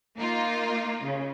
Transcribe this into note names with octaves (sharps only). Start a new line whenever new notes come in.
A#3 D#4 F4
C#3